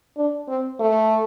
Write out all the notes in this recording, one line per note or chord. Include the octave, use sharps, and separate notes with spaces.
D4
C4
A3